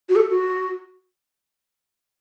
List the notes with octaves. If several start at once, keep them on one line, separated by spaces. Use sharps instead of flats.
F#4
A4
F#4